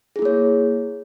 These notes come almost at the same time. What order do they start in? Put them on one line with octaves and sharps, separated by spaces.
G#4 E4 A#3 C#5